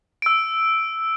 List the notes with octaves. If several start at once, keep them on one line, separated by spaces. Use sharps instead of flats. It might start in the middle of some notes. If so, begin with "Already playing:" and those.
E6 D7